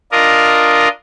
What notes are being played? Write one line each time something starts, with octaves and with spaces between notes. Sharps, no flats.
D4 F4 A#4 D#5